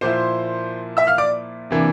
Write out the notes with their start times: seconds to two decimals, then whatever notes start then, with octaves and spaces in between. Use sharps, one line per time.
0.01 A#2 F3 A#3 E4 C5 C6
0.97 E5 E6
1.07 F5 F6
1.18 D5 D6
1.71 C3 E3 A#3 D4